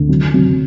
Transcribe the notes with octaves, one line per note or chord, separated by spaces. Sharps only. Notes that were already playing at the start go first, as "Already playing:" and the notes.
Already playing: D2
F#3
F#3